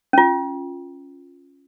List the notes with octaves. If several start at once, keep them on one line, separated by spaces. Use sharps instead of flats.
C#4 F4